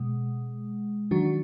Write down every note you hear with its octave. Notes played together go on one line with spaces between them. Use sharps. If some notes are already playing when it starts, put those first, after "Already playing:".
Already playing: B2 G#3
D#3 F#3 D4 F#4